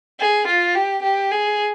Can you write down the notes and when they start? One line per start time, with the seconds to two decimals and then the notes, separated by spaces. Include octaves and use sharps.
0.19 G#4
0.48 F4
0.75 G4
1.03 G4
1.32 G#4